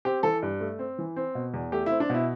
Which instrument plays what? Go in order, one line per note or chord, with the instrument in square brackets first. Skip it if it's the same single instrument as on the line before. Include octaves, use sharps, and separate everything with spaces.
[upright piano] C4 G4
E3 A4
G2
A3
C4
E3
C4
B2
E2
A3 G4
C4 E4
D4
B2 E4